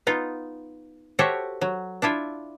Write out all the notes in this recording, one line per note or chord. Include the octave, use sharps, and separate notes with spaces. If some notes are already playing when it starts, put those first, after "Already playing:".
B3 D#4 F4
F#4 G4 A4 C5 C#5 E5
F#3
D4 E4 F4 E5